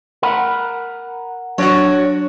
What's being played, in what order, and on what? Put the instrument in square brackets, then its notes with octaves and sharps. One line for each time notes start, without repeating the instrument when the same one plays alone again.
[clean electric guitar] A#4 F#5 B5
[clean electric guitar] F#3 D4 [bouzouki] F#4 G4 C#5